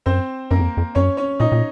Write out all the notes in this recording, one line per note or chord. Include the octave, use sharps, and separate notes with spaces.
F#2 C4 C5
F#2 A#3 A#4
F2
F2
F#2 C#4 C#5
C#4 C#5
A#2 D#4 D#5
A#2